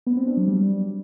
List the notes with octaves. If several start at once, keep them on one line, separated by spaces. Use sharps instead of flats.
B3
C4
D4
F#3
G3